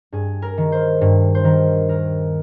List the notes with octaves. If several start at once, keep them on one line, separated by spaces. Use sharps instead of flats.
G2 G#4
A#4
D#3
C5
G2
C5
D#3 A#4
D#2 A#4